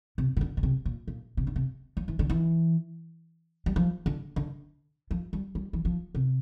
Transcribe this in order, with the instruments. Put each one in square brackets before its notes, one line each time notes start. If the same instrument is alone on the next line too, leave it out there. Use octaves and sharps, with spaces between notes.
[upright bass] C3
C3
D3
A#2
C3
A#2
A#2
C3
D3
C3
F3
E3
D3
E3
G3
F3
D3
D3
F3
G3
G3
E3
F3
C3